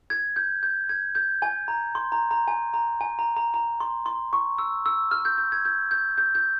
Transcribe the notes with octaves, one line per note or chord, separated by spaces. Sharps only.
G#6
G6
G6
G#6
G6
G#5
A#5
C6
A#5
A#5
G#5
A#5
G#5
A#5
A#5
A#5
C6
C6
C#6
E6
E6
F6
G6
G6
G#6
G6
G6
G6
G6